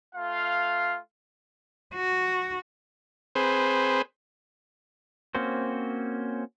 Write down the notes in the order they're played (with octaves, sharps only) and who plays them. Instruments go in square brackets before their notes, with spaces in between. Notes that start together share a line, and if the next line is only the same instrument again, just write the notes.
[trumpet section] A3 F4 F5
[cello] F#4
[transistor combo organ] C4 G#4 B4 C5
[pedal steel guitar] A#3 C4 C#4 F#4 C5